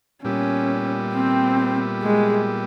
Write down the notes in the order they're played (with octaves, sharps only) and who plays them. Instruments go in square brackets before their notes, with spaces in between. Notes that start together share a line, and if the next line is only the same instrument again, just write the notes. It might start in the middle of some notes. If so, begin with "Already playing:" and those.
[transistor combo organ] A#2 G3 B3 E4 G4 [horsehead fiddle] C#4
[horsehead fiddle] C4
G#3